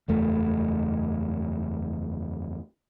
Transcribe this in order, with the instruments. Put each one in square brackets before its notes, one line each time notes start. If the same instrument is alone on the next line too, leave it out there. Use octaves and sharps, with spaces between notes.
[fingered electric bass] F#1 E2 A3